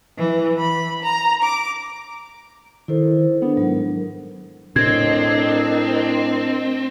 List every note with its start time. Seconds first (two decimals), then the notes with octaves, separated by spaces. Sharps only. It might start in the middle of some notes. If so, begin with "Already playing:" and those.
0.18 E3
0.57 B5
1.03 A#5
1.42 D6
2.88 D#3 E4 A4 C5
3.42 B3 D4
3.57 G#2 F#3 A#4
4.76 A2 C4 D4 A#4 D#5 G#6